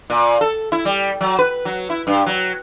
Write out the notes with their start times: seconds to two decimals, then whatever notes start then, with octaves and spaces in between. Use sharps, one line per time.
0.10 A#2
0.41 A4
0.72 E4
0.85 G3
1.21 F#3
1.39 B4
1.65 F#3
1.90 E4
2.07 G2
2.26 F#3